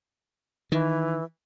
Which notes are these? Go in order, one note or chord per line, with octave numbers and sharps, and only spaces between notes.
D#3 E3